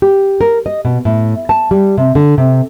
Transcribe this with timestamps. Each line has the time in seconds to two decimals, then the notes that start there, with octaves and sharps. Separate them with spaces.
0.02 G4
0.41 A#4
0.66 D#5
0.85 B2
1.05 A2
1.49 A5
1.71 G3
1.98 C3
2.15 D3
2.38 C3